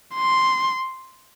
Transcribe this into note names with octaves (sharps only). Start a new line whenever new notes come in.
C6